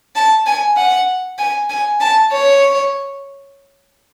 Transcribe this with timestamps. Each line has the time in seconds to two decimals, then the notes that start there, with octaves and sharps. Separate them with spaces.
0.16 A5
0.47 G#5
0.77 F#5
1.39 G#5
1.70 G#5
2.00 A5
2.33 C#5